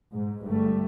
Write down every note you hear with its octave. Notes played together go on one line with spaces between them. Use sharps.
G#2
G1 G2 G3 A3